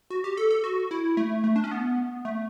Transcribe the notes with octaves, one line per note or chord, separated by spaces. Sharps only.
F#4
G4
A4
A4
F#4
E4
A3
A3
D4
C#4
B3
A3